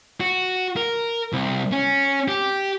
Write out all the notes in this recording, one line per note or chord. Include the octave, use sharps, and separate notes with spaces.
F#4
A#4
C2
C#4
G4